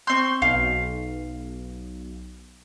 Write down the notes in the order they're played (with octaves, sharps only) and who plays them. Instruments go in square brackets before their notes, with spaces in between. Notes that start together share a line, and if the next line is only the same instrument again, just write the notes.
[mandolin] C4 G6 [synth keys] C6 C#6
[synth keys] B1 [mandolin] F5